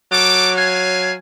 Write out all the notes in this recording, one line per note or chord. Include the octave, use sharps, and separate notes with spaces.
F#3 A4 D6
F5 G#5